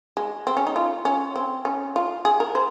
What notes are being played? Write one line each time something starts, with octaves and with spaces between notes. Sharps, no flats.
G#3
C4
C#4
D#4
F4
C#4
C4
C#4
F4
G#4
A#4
C5